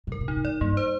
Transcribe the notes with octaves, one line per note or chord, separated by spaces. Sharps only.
A#2
G#2 A#4
A#2
C3 D#4
A#2
G#2 D5
G2 A#3
C5